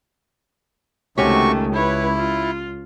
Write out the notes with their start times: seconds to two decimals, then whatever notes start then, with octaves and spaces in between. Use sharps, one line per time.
1.18 C#2 C3 D#3 A3 C#4 F#4 G4 C#6
1.75 E4 B4 C#5
2.15 F4